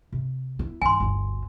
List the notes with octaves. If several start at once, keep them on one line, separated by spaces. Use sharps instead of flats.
C3
B3 E4
G2 D#3 G#5 C6
G1 D2